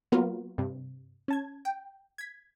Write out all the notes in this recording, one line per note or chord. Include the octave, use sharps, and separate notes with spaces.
F#3 A#3 B3 F4 F#4 A#4
G2 C3
C#4 A5 G#6
G5
G#6 B6